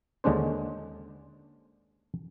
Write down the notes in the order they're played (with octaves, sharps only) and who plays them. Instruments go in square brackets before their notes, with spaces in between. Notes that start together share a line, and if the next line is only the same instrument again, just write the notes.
[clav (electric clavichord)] D#2 D3 G#3 C#4 D4 C5